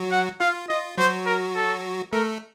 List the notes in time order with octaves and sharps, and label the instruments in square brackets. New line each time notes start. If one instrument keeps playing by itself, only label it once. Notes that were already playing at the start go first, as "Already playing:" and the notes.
Already playing: [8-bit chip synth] F#3 F#4
[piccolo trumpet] F#5
[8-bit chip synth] F4 [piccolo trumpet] F5
[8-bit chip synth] F4 [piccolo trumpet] D#5
[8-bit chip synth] F#3 F#4 [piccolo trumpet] C5
[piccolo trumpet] A#4
A4
[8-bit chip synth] A3 A4 [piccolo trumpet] A#4